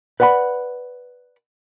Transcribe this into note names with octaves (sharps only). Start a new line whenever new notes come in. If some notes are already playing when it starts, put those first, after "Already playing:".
B4 D5 F#5 A5 B5